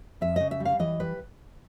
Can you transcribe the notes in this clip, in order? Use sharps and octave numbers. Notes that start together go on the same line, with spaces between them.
F2 E5
C#3 D#5
E5
G3
F5
E3 D#5
G3 B4